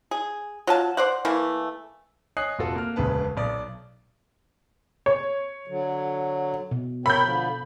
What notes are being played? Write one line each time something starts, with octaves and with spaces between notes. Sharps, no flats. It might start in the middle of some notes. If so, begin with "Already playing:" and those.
G#4
F#3 F4 A5
C5 D5 F#5
E3 A3 A#3
C#5 D#5 G#5 D#6 F#6 C7
F1 F4 F#4 A4
A#3 F6
E1 D2 C#3 B4 A5
B1 D5 D#6
C#5
D3 F#3
B2
A#4 C#5 G5 B5 G6
D3 F3